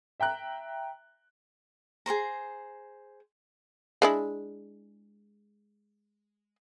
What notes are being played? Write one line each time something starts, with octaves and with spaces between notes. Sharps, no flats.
E5 G5 A#5 F#6
G#4 A#4 C5 A#5
G#3 D4 E4